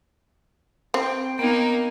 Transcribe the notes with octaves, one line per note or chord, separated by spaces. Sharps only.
C4 G5
A#3 B3 D#4